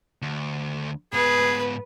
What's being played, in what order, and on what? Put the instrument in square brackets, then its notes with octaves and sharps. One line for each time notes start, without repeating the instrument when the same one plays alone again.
[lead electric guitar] D2
[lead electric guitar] G#2 B3 [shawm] G#4 [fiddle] B4